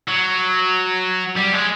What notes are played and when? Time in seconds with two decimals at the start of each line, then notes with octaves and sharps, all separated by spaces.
0.08 F#3
1.37 G3
1.53 G#3